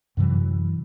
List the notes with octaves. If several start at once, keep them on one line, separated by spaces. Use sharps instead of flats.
F#2 C3 E3 F#3